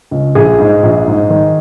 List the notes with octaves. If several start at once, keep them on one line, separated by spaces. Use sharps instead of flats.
C#2
A#1 G#4
G#2
A#1
G#2
D#3